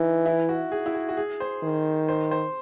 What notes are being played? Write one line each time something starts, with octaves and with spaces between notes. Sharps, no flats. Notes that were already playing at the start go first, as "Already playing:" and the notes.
Already playing: E3 D#4
E4
F#4
G#4
E4
F#4
F#4
G#4
C5
D#3
C5
C5